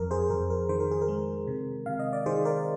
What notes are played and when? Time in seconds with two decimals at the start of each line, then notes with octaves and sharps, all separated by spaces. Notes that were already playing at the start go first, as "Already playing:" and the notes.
Already playing: F2 A#4
0.11 G#4 C5
0.30 F2 A#4
0.50 A#4
0.69 D#3 C5
0.80 A#4
0.91 G#4
1.02 A#4
1.08 G#3
1.47 C3
1.86 C3 F5
1.99 D#5
2.13 D5
2.26 D#3 G#4 C5
2.45 A#4 D5